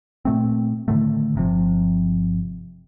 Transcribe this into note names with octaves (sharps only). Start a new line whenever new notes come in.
A#2 A3 C4
A2 D3 D#3 A3
G1 C3 F3